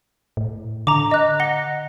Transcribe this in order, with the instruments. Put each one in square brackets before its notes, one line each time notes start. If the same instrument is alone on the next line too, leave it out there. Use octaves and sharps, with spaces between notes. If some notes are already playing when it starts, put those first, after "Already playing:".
[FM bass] A2
[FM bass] D3 [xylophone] A#5 D6
[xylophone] D#5 F#6
F#5 A#6 G7